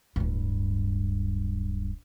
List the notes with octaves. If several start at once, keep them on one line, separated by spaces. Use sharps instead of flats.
D1 G2